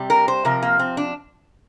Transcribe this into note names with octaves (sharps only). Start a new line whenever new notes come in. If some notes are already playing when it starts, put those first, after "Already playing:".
Already playing: C3 G3
A#4
C5
C3 F3 A#4
A#3
C4
D4